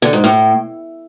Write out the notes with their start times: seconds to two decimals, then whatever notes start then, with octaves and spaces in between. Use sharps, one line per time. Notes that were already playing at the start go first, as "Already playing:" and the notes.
0.02 D3
0.13 G#2
0.24 A2